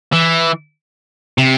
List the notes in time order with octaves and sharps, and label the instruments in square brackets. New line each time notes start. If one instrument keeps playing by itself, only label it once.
[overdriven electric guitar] E3
C3